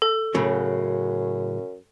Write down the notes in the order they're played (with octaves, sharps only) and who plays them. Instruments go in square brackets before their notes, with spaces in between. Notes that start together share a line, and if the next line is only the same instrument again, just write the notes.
[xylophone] A4
[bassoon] F#2 [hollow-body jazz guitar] A2 C#3 F#3